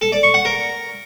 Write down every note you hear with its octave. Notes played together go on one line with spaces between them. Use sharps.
A4
D5
C#6
F#5
A#4